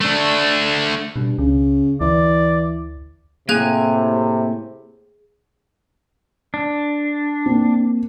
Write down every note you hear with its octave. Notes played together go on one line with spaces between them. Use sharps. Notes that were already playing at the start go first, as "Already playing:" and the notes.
A3 D4
G2 B2
C#2 C#3
D2 E3 D5
A2 C3 A#3 C4 G#4 G#5 F#6 G#6
D4
A#3 C4